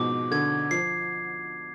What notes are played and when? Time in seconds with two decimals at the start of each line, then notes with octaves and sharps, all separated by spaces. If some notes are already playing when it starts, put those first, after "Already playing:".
Already playing: G#2 B2 F3 D6
0.31 D3 G#6
0.71 F3 C7